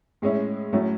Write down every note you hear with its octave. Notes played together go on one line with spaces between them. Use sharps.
A2 G#3 C#4 E4
A2 F#3 A3 C#4 E4